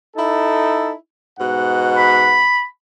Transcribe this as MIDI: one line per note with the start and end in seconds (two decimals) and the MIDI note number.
0.16 0.93 63
0.16 0.93 64
0.16 0.93 69
1.39 2.45 44
1.39 2.45 47
1.39 2.45 78
1.97 2.64 83